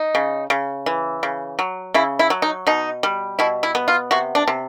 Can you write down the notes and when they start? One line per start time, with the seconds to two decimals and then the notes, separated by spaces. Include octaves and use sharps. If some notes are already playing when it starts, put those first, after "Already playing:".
Already playing: D#4
0.15 C#3
0.50 C#3
0.86 E3
1.23 C#3
1.59 F#3
1.94 C#3 E4
2.19 E4
2.30 F#3
2.42 D#4
2.67 B2 D#4
3.03 G3
3.39 B2 E4
3.63 E4
3.75 B3
3.88 F4
4.11 C3 F#4
4.35 D4
4.48 C3